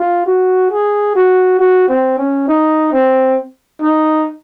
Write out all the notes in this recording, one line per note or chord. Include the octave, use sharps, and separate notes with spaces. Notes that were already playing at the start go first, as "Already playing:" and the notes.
Already playing: F4
F#4
G#4
F#4
F#4
C4
C#4
D#4
C4
D#4